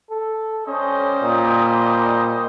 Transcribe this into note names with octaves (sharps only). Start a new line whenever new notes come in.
A4
G3 C#4 C5 D#5
A#2